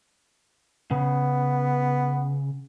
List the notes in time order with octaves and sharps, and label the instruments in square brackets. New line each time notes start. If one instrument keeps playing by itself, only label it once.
[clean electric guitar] C#3 [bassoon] B3